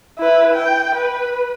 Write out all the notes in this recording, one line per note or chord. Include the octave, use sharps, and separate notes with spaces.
E4 B4
G5
B4